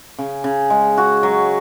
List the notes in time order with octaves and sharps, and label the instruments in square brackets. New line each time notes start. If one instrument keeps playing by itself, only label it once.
[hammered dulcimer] C#3
C#3
G#3
F#4
F#3